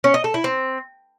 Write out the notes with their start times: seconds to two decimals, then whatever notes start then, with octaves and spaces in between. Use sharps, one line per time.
0.04 C#4
0.14 D#5
0.24 A4
0.34 E4
0.44 C4